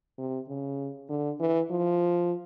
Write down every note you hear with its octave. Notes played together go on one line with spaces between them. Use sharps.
C3
C#3
D3
E3
F3